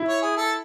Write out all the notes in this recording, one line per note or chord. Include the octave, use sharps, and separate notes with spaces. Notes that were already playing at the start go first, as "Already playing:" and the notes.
Already playing: E4
C#5
G#4
A4